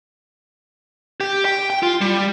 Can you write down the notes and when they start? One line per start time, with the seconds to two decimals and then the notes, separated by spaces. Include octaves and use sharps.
1.21 G4
1.45 G5
1.70 G5
1.83 F4
2.01 G3